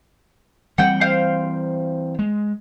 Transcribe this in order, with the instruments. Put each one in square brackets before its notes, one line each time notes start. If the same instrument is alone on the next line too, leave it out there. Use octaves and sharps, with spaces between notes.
[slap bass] E3 G3 C4 [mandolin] F#5 G5
[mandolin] C5 F5 G5
[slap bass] G#3